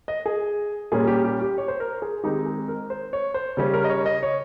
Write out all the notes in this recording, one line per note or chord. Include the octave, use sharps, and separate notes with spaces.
D#5
G#4
A#2 G3 A#3 C#4 G#4
G4
G4
G4
C#5
C5
A#4
G#4
D#3 G#3 C4 D#4 G4
G#4
A#4
C5
C#5
C5
C#3 G3 C#4
A#4
D#5
C#5
D#5
C#5